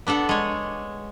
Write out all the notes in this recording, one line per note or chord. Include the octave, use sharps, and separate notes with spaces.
B3 D4 A4 F#5
G#3 C#5